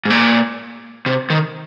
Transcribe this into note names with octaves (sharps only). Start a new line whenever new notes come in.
G#2
A#2
C3
D#3